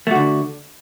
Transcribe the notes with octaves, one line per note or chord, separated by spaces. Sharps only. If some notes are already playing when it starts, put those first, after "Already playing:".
D3 A3 F#4